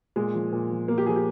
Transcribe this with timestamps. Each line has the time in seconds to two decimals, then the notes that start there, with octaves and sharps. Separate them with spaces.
0.16 A#2 G#3
0.34 F3
0.52 A#2
0.70 F3
0.88 A#2 A#3
0.98 G4
1.07 F3 G#4
1.16 G4